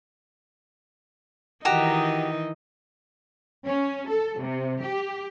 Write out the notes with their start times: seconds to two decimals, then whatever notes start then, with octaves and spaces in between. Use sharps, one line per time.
1.65 D#3 E3 D#4 F#4 G4 A#5
3.66 C#4
4.08 A4
4.39 C3
4.83 G4